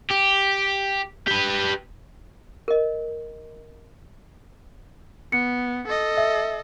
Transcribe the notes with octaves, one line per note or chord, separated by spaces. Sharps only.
G4
G4 B4
A#4 D#5
B3 C#7
A4 D#5
E5